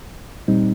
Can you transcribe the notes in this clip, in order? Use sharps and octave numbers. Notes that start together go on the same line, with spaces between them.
A#2 G3 C4 D#4